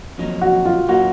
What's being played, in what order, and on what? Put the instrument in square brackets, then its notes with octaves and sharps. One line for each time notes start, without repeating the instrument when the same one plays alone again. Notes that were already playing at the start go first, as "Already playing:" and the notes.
[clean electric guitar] F2 D#3 F#3 A#3 D#4
[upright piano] F#4
F4
[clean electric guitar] F#3 A#3 D#4 [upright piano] F#4